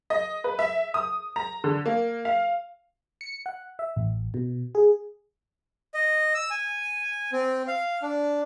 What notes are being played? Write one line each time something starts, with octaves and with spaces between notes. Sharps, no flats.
D#5
B4
E5
D#6
A#5
D3
A#3
F5
C#7
F#5
E5
A1
B2
G#4
D#5
E6
G#5
C4
F5
D4